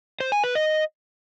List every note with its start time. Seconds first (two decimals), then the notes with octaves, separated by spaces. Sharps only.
0.20 C5
0.32 G#5
0.44 B4
0.55 D#5